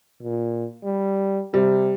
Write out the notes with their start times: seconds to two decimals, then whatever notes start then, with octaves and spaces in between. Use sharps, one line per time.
0.23 A#2
0.84 G3
1.54 C3 G3